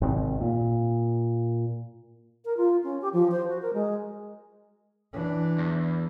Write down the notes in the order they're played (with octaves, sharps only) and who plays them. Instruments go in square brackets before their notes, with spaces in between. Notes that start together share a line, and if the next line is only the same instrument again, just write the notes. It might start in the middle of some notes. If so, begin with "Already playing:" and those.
[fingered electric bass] G#1 C3
A#2
[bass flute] A#4
F4
C#4
G4
F3
C5
F#4
A#4
G#3
[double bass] E3 D4
[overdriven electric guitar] E2